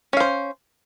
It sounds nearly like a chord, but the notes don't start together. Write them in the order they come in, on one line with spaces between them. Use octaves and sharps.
C#4 F5 C5